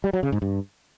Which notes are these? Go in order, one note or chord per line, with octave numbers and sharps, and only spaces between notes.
G3
F#3
C#3
G#2
G2